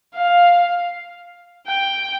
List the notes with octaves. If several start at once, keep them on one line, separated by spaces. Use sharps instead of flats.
F5
G5